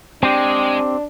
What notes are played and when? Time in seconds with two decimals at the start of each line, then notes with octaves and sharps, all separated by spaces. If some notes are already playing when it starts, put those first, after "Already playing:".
0.23 G#3 C4 D4 G4